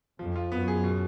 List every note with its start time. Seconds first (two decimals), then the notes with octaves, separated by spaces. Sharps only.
0.19 F2 F3
0.36 F4
0.52 F#2 B3
0.68 G#4
0.84 B2